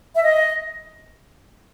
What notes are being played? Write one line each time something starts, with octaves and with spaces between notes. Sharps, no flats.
E5
D#5